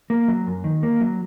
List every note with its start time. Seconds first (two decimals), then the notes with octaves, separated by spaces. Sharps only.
0.10 A#3
0.28 F#3
0.47 F#2
0.64 D#3
0.83 A#3
1.01 F#3